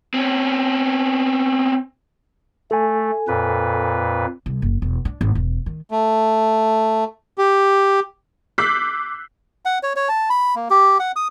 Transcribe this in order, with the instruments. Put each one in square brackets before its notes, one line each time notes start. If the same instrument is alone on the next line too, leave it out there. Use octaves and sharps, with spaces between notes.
[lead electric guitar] C4 C#4
[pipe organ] A3 [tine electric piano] A4 G#5
[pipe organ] F2 A#2 B4
[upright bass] C2
F#1
E1
D4
G#1
E1
D#3
[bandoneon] A3
G4
[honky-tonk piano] D6 E6 F#6 G6 B6 C7
[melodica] F#5
C#5
C#5
A5
B5
A#3
G4
F#5
D#6